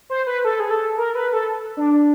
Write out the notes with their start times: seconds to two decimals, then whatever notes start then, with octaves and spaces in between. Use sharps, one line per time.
0.10 C5
0.27 B4
0.45 A4
0.60 G#4
0.71 A4
0.98 A#4
1.15 B4
1.33 A4
1.77 D4